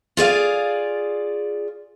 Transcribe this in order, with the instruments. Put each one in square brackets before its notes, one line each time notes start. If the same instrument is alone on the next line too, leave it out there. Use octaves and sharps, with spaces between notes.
[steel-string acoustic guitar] F4 G#4 D5 F5